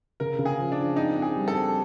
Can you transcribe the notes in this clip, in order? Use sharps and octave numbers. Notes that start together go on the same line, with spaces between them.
C#3 A#4
C#3
G#4
F3
D4
F3
C4 D#4
C4
G#4
G3
A4
C4